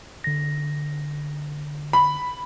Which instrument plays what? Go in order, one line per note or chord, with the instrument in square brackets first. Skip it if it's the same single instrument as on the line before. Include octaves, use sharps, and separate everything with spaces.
[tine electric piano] D3 A#6
[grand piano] B5